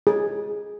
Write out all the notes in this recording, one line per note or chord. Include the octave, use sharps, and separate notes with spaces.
G#4